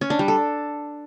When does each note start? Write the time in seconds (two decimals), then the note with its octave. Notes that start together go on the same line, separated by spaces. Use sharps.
0.01 C#4
0.10 D4
0.19 G3
0.28 A4